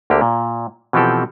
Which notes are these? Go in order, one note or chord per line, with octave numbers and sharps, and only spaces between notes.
D2 D3 A#3 G4
A#2
B2 E3 F3 C4 G4 A4